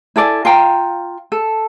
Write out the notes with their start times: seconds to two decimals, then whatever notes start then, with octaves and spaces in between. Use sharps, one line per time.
0.16 E4 A4 D5 G#5
0.45 F4 F5 G5 A#5
1.32 A4